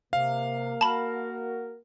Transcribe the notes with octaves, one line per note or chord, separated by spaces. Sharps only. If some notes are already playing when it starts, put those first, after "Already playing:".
C3 A#3 F5
F#4 A#4 A5 B5